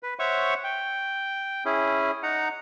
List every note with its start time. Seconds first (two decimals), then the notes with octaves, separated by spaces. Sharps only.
0.03 B4
0.19 C5 C#5 E5 F#5 C#6
0.64 G5
1.65 C#4 E4 G#4
2.23 D#4 F#5 A#5